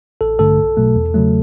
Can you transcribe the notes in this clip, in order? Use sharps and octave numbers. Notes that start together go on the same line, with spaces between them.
A1 A4
G2 D3 A3 A4
B1
B2 F#3 A3
E2
C#3 F#3 A3